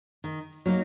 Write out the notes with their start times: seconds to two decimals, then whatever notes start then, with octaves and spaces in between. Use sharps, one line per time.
0.24 D#3
0.66 F#3 A#3 D#4